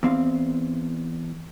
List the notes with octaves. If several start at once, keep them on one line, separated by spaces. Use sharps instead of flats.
E2 C4 F5